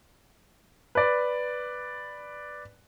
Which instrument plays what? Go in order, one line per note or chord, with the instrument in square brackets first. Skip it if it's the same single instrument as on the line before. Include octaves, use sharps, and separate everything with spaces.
[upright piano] B4 D5